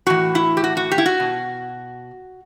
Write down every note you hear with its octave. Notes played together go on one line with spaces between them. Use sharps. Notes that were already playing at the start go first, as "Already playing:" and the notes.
A2 E3 F#4
E4
G4
F#4
F#4
G4
E4
F#4
B2